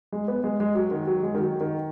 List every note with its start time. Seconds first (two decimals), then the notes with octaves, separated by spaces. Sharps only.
0.12 G#3
0.28 B3
0.44 G#3
0.60 G#3
0.75 F#3
0.91 D#3
1.07 F#3
1.23 G#3
1.35 D#3
1.39 F#3
1.60 D#3